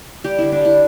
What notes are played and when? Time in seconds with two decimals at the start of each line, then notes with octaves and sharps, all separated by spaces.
0.24 G3 G4
0.38 D3 E4
0.52 D4
0.61 G3 E4